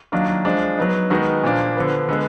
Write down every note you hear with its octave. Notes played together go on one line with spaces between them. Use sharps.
D#3 F#3 A#3 D4 F4
F3 G#3 D4 F4
F#3 B3 D#4
D#3 G#3 B3 D#4 F#4
A#2 F3 A#3 D4
D3 F3 B3
D3 G#3 B3